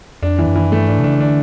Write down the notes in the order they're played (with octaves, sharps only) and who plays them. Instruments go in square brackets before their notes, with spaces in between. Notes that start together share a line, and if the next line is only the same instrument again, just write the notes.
[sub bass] F2 [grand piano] D4
[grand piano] E3
[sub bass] F#2
[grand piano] E3
[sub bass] G2 [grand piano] A3
[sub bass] G#2 [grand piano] D4
[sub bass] C3
[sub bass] C#3 [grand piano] D4
[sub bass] D3 [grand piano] D4